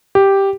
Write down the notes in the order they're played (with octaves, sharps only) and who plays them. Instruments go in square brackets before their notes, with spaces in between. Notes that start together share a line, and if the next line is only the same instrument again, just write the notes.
[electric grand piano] G4